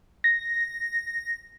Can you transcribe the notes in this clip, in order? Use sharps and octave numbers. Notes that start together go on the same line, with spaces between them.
A#6